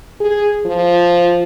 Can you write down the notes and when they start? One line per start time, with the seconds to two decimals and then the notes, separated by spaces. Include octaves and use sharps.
0.20 G#4
0.65 F3